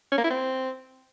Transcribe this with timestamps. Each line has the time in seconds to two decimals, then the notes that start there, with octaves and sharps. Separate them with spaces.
0.12 C#4
0.18 A#3
0.24 E4
0.30 C4